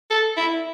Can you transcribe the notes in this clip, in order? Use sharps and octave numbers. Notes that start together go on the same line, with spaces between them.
A4
E4